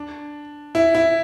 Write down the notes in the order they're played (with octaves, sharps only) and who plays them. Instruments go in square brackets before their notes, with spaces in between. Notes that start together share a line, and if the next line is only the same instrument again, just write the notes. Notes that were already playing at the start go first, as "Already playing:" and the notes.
Already playing: [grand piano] D4
E4
E4